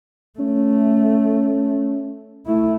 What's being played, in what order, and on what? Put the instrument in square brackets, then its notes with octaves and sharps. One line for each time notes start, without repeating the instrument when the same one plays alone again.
[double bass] A3 [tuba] C#4
[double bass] A3 E4